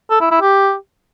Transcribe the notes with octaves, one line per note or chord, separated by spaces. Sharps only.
A4
E4
E4
G4